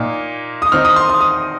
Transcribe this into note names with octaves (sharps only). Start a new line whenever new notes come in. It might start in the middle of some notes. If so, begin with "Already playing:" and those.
Already playing: A#2 A#3 D#4
D#6
D#3 C4 D#4 F6
D#6
C6
D#6
D#6